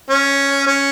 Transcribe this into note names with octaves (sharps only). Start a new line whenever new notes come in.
C#4
C#4